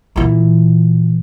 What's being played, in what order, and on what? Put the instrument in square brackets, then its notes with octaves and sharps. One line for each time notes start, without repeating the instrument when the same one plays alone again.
[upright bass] A#2 E3